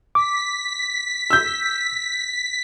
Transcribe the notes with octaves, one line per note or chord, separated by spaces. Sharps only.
D6 B6
E6 G6